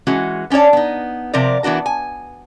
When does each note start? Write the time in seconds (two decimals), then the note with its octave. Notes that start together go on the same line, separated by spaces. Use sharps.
0.07 E3 G#3 C#4 F#4
0.50 B3 C#4 D4 C#5 D5
0.73 B3 D#4
1.34 C3 F3 A#4 D5
1.63 E3 B3 D4 F#4 A#4
1.86 G#5